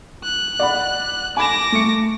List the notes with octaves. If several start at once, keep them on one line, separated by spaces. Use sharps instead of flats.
F#6
D5 F#5 B5
G#5 B5 D6 A#6 E7
A3 C#7